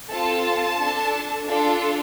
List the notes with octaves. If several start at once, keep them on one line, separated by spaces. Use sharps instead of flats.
C4 F4 A4 A5
D4 A4
D4 F4 A4